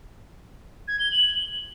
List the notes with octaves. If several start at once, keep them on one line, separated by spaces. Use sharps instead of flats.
G#6
G7
F#7